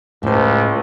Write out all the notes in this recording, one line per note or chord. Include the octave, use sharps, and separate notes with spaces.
C#2 A2 C5